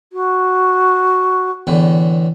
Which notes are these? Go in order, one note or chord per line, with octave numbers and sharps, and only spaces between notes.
F#4
E2 A2 D3